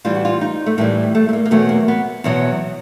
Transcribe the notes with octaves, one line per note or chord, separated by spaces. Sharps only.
A2 E3 G3 F4
F#4
F4
D#4
A3
A2 E3 G3 A#3
A3
A3
A#3
A#3
E2 B2 F#3 A3
A#3
B3
E2 B2 F#3